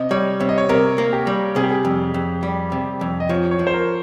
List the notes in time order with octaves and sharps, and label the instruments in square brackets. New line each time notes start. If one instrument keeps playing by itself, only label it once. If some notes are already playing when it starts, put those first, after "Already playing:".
Already playing: [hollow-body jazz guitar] C3 [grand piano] D#5
[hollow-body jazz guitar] G3 [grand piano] C#5
[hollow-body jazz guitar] C3 [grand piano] C#5
[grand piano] D#5
C#5
[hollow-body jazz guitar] C3 [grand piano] A#4
[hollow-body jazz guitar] A#3
[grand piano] G4
[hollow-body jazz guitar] G3
[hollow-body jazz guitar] C3 [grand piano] G#4
[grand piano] G4
G#4
[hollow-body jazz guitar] F2
F2
G3
C3
F2
[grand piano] D#5
[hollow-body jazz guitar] F3 [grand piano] C#5
[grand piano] C#5
[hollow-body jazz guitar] F3
[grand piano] C5
A#4